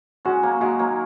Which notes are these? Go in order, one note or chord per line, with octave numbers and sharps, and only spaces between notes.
G#3 C#4 F#4
F#3 A#3
D#3 G#3 F#4
F#3 A#3